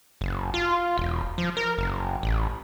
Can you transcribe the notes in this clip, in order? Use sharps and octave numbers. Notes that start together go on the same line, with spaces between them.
F#1
F4
E1
F3
A#4
F#1
A1